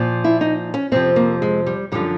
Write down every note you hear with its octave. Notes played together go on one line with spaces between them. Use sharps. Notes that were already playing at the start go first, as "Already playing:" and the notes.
Already playing: A#2 F3
E4
D#4
C#4
F2 C3 F3 C4
A#3
G#3
G3
F#2 D3 F3 G3